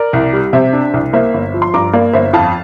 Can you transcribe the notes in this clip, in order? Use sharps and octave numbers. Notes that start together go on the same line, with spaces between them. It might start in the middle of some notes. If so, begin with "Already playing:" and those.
Already playing: A#4 D5
C2
G3
C3 C5 E5
D4
C2
A#3 C5 E5
G1
F3
C6
G2 A#5 D6
A#3 D5 F5
G1 C5 E5
F2 F5 A5